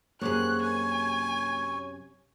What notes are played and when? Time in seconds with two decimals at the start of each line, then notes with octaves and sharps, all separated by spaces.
0.21 F#2 C3 A#3 G#4 C#5 F#6
0.63 G#5